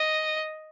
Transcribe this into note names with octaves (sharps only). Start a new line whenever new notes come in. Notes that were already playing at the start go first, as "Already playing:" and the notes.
Already playing: D#5